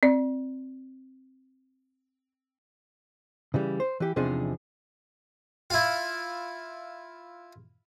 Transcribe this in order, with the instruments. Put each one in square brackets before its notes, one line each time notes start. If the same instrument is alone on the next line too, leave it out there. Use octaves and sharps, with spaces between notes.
[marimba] C4 D5
[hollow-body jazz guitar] C#3 E3 G3
C5
E3 G4
E2 C3 F3 D4 D#4 G#4
[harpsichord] E4 F4